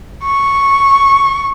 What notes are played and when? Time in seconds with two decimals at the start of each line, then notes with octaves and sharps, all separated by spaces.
0.25 C#6